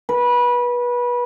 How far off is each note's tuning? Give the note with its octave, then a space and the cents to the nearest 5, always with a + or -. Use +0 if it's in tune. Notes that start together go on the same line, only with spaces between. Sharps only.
B4 -25